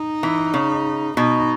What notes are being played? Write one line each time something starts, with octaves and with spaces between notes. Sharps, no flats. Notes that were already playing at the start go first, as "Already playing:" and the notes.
Already playing: D#4
E3
C#3
B2 D#4